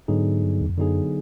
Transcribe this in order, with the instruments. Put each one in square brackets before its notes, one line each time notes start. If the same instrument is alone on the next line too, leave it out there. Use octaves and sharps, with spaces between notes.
[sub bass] G#2 [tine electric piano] D3 F#3 B3 D#4 G#4
[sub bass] G2
E2
F2
[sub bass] F#2 [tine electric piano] D3 F#3 B3 D#4 G#4